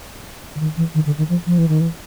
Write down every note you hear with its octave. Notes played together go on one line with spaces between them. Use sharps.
D3
D#3
E3
D#3
D3
D#3
F3
F3
E3
D#3
E3